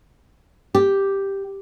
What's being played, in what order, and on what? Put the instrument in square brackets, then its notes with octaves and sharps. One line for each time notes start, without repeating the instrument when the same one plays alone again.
[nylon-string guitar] G4